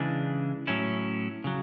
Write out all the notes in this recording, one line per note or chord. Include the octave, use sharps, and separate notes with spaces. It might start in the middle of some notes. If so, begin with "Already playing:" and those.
Already playing: C#3 E3 G#3 D4
A2 F#3 C#4 E4
C#3 F#3